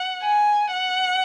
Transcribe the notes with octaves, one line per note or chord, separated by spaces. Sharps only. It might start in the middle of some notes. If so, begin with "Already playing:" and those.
Already playing: F#5
G#5
F#5